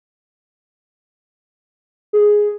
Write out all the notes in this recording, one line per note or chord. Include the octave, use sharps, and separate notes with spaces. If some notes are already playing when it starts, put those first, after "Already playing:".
G#4